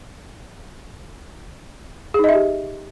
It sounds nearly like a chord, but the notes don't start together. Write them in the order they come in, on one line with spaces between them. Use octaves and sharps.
G#4 D#4 D#5 E5 G4